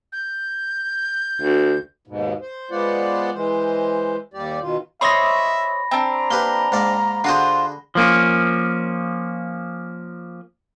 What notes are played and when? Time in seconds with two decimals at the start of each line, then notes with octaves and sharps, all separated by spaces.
0.12 G6
1.42 D2
2.07 D#2 G#2 B2
2.41 C5
2.71 G#3 B3 F4 C5 D5 F#5
3.34 E3 G#3 C5
4.34 D#2 G3 G4 D5
4.61 B2 D#3 F4
5.01 C5 C#5 D#5 E5 B5 A#6
5.91 C4 D4 A#5
6.31 A#3 G4 B4 G7
6.72 G#2 A#3 D5
7.24 D3 F4 F#4 G#4 C5
7.95 F3 A#3 C#4